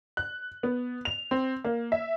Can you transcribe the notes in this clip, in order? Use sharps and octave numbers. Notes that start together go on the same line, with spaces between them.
F#6
B3
F7
C4
A#3
E5